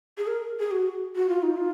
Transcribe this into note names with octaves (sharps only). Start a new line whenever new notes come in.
G#4
A#4
G#4
F#4
F#4
F4
D#4
F4